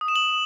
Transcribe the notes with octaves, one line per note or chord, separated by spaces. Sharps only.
D#6
E7
F#7